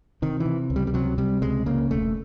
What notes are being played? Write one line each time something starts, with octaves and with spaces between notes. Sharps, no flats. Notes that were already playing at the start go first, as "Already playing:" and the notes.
C3 D#3
E3
C3
C#2
G3
G3
C3 F#3
C3 G3
C#2 G#3
C#3 A#3
E1 A3